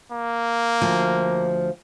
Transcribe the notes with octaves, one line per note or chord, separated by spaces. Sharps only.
A#3
D2 F3